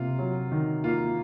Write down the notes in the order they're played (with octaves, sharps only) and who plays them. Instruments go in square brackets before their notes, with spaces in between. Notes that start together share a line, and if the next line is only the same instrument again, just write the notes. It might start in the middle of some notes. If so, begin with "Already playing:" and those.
Already playing: [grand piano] C3 A#3 [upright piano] F4
[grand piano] F#3
D#3
[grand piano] A#3 [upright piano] F4